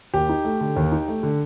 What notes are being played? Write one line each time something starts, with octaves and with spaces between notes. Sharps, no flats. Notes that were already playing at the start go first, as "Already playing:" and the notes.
D#2 G4
D#4
A3
D3
D#2
D#4
A3
D3